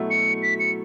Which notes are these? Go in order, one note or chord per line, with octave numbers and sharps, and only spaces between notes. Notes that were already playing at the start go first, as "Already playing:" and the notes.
Already playing: B2 F#3 A3 E4
C#7
B6
C#7